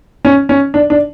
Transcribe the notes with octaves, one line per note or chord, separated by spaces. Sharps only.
C#4
C#4
D4
D4